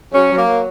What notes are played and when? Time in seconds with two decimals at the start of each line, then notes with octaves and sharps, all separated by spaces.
0.13 F#3 C#4
0.31 F#3
0.38 A#3
0.47 F#3